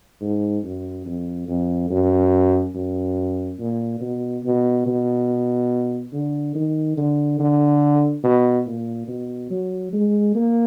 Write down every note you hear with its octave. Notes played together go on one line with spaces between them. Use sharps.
G#2
F#2
F2
F2
F#2
F#2
A#2
B2
B2
B2
D3
D#3
D3
D3
B2
A#2
B2
F#3
G#3
A#3